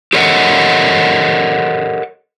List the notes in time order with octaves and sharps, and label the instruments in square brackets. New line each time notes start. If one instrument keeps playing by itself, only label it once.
[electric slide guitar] G4 A4 A#4 C#5 D#5 F#5